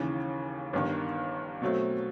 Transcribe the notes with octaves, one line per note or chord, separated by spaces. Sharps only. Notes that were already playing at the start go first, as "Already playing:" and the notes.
Already playing: D#2 C#3 E3
G1 G2 D#3
B2 F#3 A3 C4